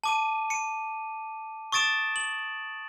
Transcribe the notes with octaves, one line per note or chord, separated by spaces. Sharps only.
A5 D6 D#7
C#7 D#7
C#6 D#6 A6 D7 E7
F#7